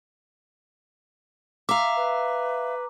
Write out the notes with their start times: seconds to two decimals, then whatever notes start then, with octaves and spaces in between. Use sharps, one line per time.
1.69 E5 F5 A#5 D6
1.97 B4